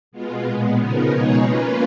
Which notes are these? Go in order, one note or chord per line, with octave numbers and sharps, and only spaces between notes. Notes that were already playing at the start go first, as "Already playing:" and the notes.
B2 G#3 B3 F4
A#2 G#3 B3
C#3 F3 B3 D#4 A#4
B2 G#3 D#4 G#4 C#5
A#3 C#4 F4 B4